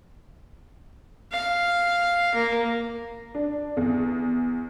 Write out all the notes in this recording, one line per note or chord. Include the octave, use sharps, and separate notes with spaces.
F5
A#3
D4
E2